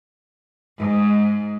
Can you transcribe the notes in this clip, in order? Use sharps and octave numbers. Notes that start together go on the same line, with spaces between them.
G#2